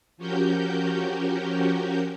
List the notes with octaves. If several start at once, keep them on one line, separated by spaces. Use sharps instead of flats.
F3 C#4 F#4 G4 A#4 G6